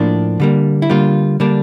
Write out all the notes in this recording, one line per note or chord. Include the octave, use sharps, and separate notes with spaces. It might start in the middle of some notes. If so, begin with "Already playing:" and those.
Already playing: A2 F3 A#3 D4
D3 G3 A#3
E4
D3 G3 A#3 F4
D3 G3 A#3 D4